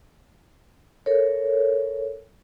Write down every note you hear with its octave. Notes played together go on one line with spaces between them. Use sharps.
A4 A#4 C#5